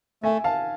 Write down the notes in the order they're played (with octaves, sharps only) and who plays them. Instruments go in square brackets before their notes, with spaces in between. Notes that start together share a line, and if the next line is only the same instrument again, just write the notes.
[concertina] A3 [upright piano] E5 G#5
[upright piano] F5 A5